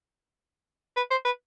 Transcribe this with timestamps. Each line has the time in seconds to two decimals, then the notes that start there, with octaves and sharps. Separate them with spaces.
0.97 B4
1.11 C5
1.25 B4